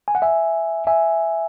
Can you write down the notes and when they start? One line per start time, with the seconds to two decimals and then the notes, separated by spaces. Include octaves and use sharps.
0.08 G#5
0.15 F#5
0.22 E5 G#5
0.87 E5 G#5